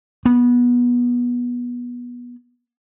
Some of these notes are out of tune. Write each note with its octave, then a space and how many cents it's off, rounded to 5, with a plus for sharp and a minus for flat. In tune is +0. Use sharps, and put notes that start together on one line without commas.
B3 -20